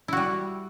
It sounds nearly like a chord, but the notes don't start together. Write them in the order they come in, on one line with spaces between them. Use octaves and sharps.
E4 F#4 G3